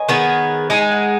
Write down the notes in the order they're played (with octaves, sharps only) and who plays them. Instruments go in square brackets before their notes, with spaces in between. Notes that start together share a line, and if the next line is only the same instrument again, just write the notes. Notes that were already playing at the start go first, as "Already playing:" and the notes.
Already playing: [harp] B4 C#5 D#5 G#5
[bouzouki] D#3 B3 G#4 [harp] F#5
[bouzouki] G#3 D#4 G#4 [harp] G#5
[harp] G#5
F#5